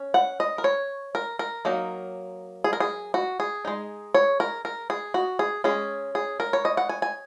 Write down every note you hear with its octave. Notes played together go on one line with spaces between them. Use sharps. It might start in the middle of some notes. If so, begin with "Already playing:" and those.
Already playing: C#4
F#5
D#5
A#4
C#5
A#4
A#4
F#3 A#3 D#4
G#4
A#4
G#4
F#4
G#4
G#3 D#4
C#5
A#4
A#4
G#4
F#4
G#4
G#3 C#4 G#4
G#4
A#4
C#5
D#5
F#5
G#5
G#5